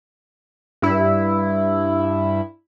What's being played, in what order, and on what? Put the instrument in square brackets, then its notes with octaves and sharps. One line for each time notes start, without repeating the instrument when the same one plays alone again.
[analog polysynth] G2 E4